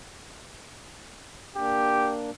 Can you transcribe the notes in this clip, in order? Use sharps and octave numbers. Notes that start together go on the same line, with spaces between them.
A#3 D4 G4